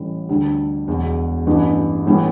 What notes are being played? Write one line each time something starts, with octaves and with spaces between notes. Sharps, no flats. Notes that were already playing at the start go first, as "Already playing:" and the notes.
Already playing: A1 A2 E3 G3
D2 D3 G3
E1 E2 B2
A1 G2 E3 B3
B1 A2 E3 G3 B3